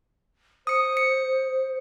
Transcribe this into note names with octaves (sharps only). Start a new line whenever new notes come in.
C5 D#6 C#7
C#7